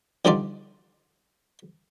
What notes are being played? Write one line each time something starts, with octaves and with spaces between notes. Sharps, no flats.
D3 F3 G3 D#4 F4 D5